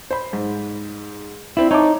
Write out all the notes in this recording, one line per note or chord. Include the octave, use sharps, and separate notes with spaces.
C5 B5
G#2
C4 D4 E4
D#4 C#5 A5 D6